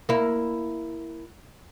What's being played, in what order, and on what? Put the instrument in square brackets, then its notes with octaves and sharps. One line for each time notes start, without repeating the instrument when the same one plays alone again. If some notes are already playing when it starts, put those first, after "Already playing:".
[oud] A#3 E4